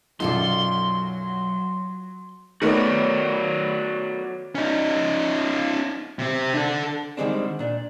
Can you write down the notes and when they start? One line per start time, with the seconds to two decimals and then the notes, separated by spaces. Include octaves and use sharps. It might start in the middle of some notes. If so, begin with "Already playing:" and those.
0.20 B1 F#2 F#3 F4 A4 D5 C6
2.62 D#3 A3 B3 F#4 C#5 D5
4.55 C#4 D#4
6.19 C3 C4
6.54 D4 A4
7.17 D3 D#3 G3 G#3 C4 D4
7.59 A#2 D4